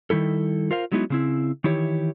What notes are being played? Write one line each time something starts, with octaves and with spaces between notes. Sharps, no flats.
D#3 G3 E4 A4
F4 A#4 C5 F5
F#3 G#3 B3 D#4 E4 F#4
C#3 C4 E4
D#3 E3 E4 G4 C#5